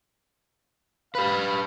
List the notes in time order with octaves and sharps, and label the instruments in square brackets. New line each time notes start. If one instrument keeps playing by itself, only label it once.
[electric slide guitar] G4 B4 [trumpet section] F5 B5